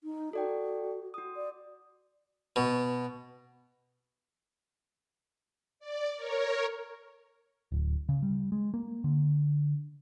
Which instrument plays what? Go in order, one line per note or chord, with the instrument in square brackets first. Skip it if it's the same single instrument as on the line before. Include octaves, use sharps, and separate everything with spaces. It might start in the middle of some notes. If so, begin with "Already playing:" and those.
[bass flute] D#4
[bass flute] F#4 [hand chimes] A4 D5 G5
[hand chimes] F#4 D#6
[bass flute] D5
[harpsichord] B2
[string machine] D5
A#4 C#5
[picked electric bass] D1
C#3
G3
G#3
A#3
D3